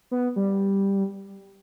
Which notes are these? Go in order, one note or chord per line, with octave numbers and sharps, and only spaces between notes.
B3
G3